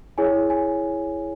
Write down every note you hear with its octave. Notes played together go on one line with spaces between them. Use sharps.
E4 G#4 C#5 G#5
G#5